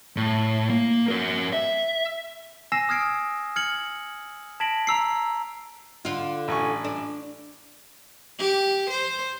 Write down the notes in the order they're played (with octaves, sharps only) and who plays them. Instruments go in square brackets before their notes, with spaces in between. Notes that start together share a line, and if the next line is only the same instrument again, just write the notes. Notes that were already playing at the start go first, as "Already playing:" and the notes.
[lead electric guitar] A2
A#3
F#4 A#4
E5
[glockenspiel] G#5 E6 A#6 C7 E7
D#6 F6 G#6 C7 D7
F6 G#6 C#7 F#7
A5 G#6 A#6 B6 D7 F#7
A#5 E6 C7
[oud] D3 F4
[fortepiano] A1 G#5 C#6
[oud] D4
[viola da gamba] G4
C5